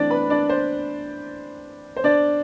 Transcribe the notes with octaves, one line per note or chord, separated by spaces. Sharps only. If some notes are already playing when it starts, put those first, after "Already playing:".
Already playing: E3 A3 C4 D4 D5
B4 B5
D4 D5
C5
C5
D4 D5